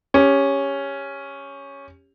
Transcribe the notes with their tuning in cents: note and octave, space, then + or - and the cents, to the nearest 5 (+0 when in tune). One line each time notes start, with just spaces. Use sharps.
C#4 +0 G4 +20